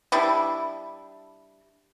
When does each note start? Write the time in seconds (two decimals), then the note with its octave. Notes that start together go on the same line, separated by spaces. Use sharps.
0.12 G3 D4 E4